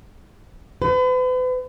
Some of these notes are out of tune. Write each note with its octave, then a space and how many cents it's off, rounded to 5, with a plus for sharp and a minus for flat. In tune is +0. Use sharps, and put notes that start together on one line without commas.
B4 +40